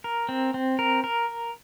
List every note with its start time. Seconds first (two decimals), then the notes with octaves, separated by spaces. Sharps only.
0.04 A#4
0.29 C4
0.54 C4
0.79 A#4
1.04 A#4